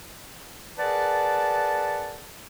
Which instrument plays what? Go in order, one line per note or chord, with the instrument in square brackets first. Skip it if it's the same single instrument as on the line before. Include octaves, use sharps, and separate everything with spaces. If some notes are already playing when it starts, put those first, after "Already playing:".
[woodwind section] G#4 A#4 B4 D5 F#5 A5